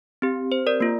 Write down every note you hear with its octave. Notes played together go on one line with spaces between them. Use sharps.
C4 G4
C5
A#4 D5
A#3 F4